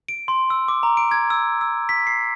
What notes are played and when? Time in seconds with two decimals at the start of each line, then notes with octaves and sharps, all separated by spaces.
0.09 D7
0.28 C6
0.50 E6
0.68 D6
0.83 A#5
0.97 D7
1.11 G#6
1.30 E6
1.61 E6
1.89 B6
2.07 C7